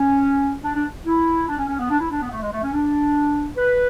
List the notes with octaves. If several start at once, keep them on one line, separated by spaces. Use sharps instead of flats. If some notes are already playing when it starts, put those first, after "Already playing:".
Already playing: C#4
D4
D4
E4
D4
C#4
C#4
B3
D4
E4
D4
B3
A3
G#3
A3
C#4
D4
B4